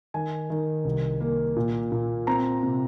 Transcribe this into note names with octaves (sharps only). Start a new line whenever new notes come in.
D#3 G#5
D#3
C2
A#3
A#2
A#2
C4 A#5
C3